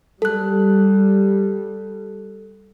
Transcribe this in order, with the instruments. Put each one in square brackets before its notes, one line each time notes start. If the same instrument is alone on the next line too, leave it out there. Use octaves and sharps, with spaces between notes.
[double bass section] G3 [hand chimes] A4 F#6